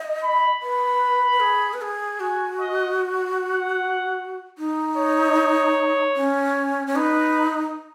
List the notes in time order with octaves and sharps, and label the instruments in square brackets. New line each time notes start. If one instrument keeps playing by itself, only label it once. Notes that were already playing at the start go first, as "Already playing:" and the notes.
Already playing: [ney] D#5
[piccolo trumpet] B5
[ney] B4 [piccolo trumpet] B5
[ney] B4
G#4
B4
G#4
[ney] F#4 [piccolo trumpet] G#5
[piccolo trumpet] D#5
F#5
[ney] D#4
[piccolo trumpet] C#5
[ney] C#4
C#4
[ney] D#4 [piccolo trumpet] B4